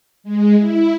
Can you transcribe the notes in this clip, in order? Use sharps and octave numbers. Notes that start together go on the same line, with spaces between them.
G#3
E4